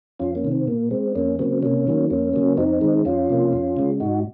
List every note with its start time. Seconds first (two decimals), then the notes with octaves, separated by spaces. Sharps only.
0.19 F2 C#4 F4
0.35 A#3 C#4
0.44 C3 D#3
0.52 C4
0.68 A#2 A#3
0.91 G#3 C4
1.15 F2 A#3 C#4
1.39 C#3 F#3 A#3 C4
1.62 C3 A#3 C#4
1.87 D#3 F#3 A#3
2.10 F2 A#3 C#4
2.33 C#3 F#3 A#3
2.57 F2 C4 D#4
2.81 D#3 G#3
3.05 F2 C#4 F4
3.30 C3 F3 A#3
3.53 F2
3.77 C#3 G#3
4.00 G#2 D#4 F#4